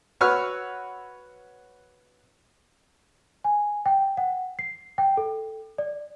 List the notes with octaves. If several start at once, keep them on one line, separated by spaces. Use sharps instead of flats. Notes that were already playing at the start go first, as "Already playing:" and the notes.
F#4 B4 C#5 E6 F6
G#5
G5
F#5
C7
G5
A4
D5